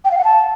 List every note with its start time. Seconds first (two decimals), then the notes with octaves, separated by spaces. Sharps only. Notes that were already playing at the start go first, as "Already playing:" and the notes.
0.05 G5
0.11 F5
0.18 F#5
0.24 A5